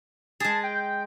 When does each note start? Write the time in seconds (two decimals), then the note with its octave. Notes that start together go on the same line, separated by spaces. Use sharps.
0.40 G#3 G#4 A5
0.64 G5